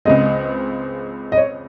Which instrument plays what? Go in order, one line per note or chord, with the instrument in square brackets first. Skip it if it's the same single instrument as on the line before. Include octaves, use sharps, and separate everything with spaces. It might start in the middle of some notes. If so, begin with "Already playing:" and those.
[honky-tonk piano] C#2 C#3 G#3 C4 [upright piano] D#5
[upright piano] D#5
C#5